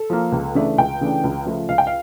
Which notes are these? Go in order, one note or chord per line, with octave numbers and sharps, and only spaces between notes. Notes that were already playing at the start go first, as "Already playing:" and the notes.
Already playing: A4
F3 A#3
C#2
C#3 E3 A3 D4
C#2 G5
C#3 E3 A3 D4
C#2
C#3 F3 A3
C#2 F5
G5
F5